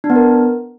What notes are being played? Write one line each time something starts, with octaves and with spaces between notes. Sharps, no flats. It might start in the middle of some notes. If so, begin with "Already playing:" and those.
D4
B3
A#4